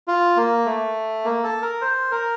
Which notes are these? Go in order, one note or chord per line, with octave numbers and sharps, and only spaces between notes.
F4
A#3
A3
A#3
A4
A#4
C5
A#4